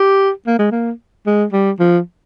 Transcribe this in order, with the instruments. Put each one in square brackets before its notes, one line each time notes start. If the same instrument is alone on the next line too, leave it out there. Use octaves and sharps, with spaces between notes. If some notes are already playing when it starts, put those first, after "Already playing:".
Already playing: [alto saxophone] G4
A#3
G#3
A#3
G#3
G3
F3